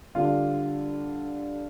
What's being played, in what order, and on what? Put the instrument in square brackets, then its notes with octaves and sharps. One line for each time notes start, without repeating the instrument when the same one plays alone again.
[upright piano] D3 G3 D4 F4